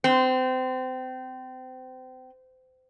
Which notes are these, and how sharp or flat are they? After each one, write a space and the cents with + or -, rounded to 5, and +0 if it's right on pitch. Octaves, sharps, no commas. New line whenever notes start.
C4 -30